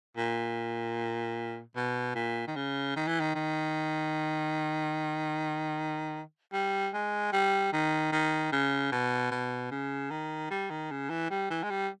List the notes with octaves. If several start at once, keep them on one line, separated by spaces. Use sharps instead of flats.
A#2
B2
A#2
D#3
C#3
D#3
E3
D#3
D#3
G3
G#3
G3
D#3
D#3
C#3
B2
B2
C#3
D#3
G3
D#3
C#3
E3
G3
E3
G#3
G3